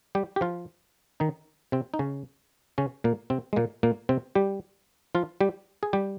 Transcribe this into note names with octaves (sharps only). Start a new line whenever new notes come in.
G3 G4
G4
F3 F4
D#3 D#4
C3 C4
D#4
C#3 C#4
C#3 C#4
A#2 A#3
C3 C4
G#3
A#2 A#3
A#2 A#3
C3 C4
G3 G4
F3 F4
G3 G4
G#4
G3 G4